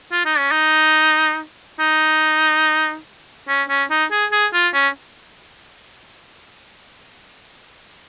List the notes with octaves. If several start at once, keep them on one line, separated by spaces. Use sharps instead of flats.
F4
D#4
C#4
D#4
D#4
C#4
C#4
D#4
G#4
G#4
F4
C#4